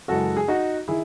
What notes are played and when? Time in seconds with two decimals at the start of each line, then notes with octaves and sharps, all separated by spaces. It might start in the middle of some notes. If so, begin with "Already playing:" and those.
0.08 F#2 C#3 E3 G#3 F#4 A4
0.37 G#4
0.48 D#4 F#4
0.88 D#3 E4 G#4